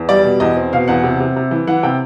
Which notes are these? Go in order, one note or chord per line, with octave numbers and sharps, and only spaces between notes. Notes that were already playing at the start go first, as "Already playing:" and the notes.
Already playing: E2
G3 D5
B2
E2 D#5
C4
B2 F5
E2 F#5
C3
C3
C3
E3
E3 F#5
C3 G5